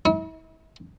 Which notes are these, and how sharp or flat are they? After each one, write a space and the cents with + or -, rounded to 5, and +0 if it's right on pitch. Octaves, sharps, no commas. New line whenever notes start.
E4 -40